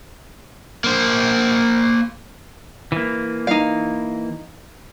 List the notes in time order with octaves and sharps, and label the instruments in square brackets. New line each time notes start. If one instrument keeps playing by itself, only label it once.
[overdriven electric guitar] A#3 C5
[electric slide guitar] E3 A#3
[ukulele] D#4 F5